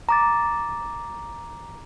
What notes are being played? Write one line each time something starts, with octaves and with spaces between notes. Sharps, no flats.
A#5 D6 A6